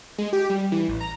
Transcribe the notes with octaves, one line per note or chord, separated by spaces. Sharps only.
G#3
G4
G3
E3
A1
A#5